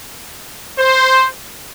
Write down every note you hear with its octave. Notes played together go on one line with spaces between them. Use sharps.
C5